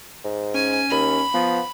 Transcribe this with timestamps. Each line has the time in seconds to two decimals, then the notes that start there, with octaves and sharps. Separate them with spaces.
0.24 G#2
0.54 C#4 G#5
0.91 D#2 B5
1.34 F3 B3